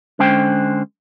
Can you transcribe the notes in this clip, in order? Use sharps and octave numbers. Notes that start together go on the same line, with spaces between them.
D3 G#3 C#4 C5 G5